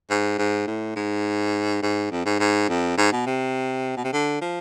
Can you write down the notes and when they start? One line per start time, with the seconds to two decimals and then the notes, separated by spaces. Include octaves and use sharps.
0.10 G#2
0.38 G#2
0.67 A2
0.96 G#2
1.82 G#2
2.11 F2
2.25 G#2
2.40 G#2
2.69 F2
2.98 G#2
3.12 B2
3.26 C3
3.97 B2
4.04 C3
4.12 D3
4.41 F3